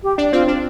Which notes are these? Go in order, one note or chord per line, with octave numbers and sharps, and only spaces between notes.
G4
D4
C4 F4
D4